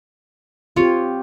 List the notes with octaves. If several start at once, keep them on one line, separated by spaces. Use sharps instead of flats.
C4 F4 G4 C#5